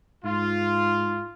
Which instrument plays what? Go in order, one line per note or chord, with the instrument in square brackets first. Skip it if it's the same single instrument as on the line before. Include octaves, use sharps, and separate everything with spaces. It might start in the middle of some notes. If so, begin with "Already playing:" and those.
[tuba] G#2 [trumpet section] F4